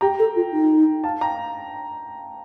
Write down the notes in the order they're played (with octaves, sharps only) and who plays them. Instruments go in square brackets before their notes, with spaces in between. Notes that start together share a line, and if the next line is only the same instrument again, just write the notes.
[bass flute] G4 [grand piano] G5 A#5
[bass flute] A4
F4
D#4
[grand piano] F5 A5
G5 A#5